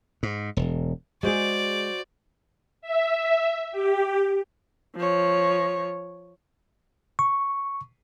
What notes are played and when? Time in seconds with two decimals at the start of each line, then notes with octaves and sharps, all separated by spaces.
0.23 G#2
0.57 E1
1.23 G#3 F#4 G#4 C5 D5
2.81 E5
3.72 G4
4.96 F3 C#5
7.19 C#6